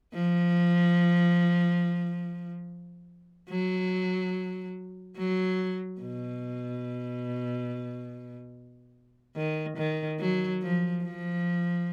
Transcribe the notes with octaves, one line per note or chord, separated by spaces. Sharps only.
F3
F#3
F#3
B2
D#3
D#3
F#3
F3
F3